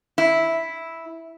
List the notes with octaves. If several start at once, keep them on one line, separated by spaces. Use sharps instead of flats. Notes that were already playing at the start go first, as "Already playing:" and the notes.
E4